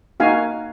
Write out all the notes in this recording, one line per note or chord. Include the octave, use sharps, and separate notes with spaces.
A#3 D#4 F#4 F5 G#5